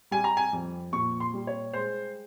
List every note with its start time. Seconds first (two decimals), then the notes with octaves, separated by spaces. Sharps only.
0.11 G3 G#5
0.24 A#5
0.37 G#5
0.53 F2
0.93 A#2 C#6
1.20 C6
1.34 G3
1.47 C#5
1.73 G#3 C5